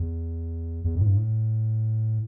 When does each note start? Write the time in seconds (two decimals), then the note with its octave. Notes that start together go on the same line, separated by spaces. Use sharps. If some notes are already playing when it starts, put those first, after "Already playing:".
Already playing: E2
0.84 E2
0.95 F2
1.01 A2
1.06 G2
1.17 A2